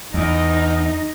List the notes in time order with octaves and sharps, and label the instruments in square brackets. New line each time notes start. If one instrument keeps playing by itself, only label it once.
[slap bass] E2 [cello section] D#4